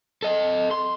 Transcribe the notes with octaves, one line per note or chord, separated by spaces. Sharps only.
A4 D#5
C6